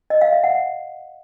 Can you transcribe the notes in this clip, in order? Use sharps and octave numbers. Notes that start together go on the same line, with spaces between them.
D#5
F5
E5
F#5